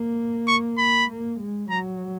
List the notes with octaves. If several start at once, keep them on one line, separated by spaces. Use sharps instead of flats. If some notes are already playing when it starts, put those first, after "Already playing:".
Already playing: A#3
C#6
B5
A#3
G#3
F#3 A#5